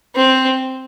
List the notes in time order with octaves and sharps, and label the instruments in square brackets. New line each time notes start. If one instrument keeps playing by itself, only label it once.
[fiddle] C4